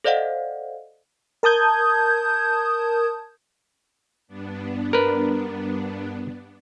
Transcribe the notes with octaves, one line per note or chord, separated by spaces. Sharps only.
A4 C5 D5 D#5 F5 F#5
A#4 A5 D#6 G6 G#6
G2 B3 D4
A#4 B4